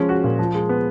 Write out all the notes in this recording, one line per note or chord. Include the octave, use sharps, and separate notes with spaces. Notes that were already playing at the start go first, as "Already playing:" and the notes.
Already playing: F3 G#3 C#4
F#4
A#2
F3
G#3
B3